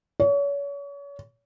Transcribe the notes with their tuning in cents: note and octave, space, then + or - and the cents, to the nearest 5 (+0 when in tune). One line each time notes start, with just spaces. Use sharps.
C#5 +35